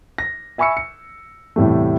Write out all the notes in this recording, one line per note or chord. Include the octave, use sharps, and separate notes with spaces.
A#6
E5 G#5 B5 C#6 E6 C#7
C#7
E2 A2 C3 G3 A3